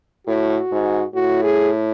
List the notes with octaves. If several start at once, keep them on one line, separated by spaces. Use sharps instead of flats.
A2 F#4
G#2
A2 F#4
G#4